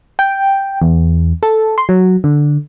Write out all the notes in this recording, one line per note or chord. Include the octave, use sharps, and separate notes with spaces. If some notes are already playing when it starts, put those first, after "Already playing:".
G5
E2
A4
C6
F#3
D3